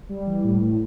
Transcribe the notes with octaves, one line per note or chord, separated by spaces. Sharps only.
G3
E3
A2
A2